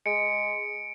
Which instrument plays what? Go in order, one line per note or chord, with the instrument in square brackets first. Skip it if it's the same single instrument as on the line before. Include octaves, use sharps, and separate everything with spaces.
[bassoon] G#3 [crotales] C#7 D7